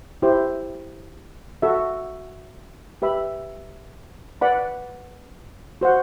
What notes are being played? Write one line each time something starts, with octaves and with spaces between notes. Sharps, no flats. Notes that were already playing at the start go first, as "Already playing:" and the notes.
E4 G4 C5
F#4 A4 E5
G4 B4 E5 B5
B4 D5 F#5 B5
F#4 C5 F#5